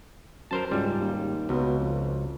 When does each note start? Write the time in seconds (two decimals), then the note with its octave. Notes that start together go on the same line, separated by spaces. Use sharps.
0.51 F#2 A#4 C5 A5
0.71 C#2 G#2 G3
1.00 D#2
1.49 C#2 B2
1.79 F2